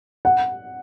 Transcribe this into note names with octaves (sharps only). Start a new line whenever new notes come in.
F#5